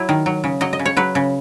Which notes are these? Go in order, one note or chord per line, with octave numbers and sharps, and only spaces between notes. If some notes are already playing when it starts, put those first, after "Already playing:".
Already playing: F#3 E4
D#3
F#3
C#3
F#3 D#5
D#5
C#3
C#5
F#3 B4
C#3